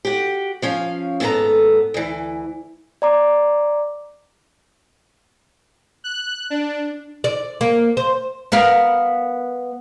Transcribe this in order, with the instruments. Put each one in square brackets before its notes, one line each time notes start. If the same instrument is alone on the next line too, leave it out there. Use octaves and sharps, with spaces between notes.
[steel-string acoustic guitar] F#4 G4
F3 C#4 F5
D#2 G#2 B3 G4 A4 A#5
D2 E3
[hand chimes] D5 A#5 D6
[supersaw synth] F#6
D4
[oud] D5
A#3
C5
B3 A#4 F5